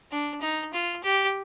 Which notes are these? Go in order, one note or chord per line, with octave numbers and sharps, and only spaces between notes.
D4
D#4
F4
G4